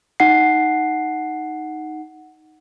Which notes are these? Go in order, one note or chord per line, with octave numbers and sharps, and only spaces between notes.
D#4 F#5 C7